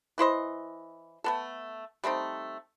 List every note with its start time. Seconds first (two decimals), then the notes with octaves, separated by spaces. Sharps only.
0.18 E3 E4 C5 D#5
1.24 A3 B3 A4
2.04 G3 A3 C4 D#4